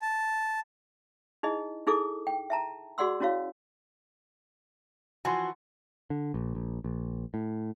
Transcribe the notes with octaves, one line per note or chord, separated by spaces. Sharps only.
A5
D#4 E4 G#4 D#5
D#4 E4 G#4 A4 D6
G5
E5 A5 A#5
F#4 G#4 D5 F#5 C6 E6
C#4 E4 F#4 C#5 F5
E3 F3 F#4 G#5 C6
D3
A#1
A#1
A#1
A2